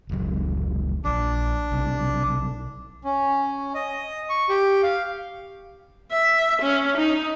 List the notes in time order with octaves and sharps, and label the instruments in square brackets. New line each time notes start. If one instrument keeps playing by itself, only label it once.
[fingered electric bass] F1 C#2 F#3
[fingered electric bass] A#1 [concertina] D4
[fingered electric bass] B1 C3
[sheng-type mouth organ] C#4
D#5
C#6
G4
F5
[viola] E5
C#4
D#4